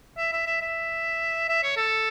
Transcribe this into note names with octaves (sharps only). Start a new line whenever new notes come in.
E5
E5
E5
E5
E5
C#5
A4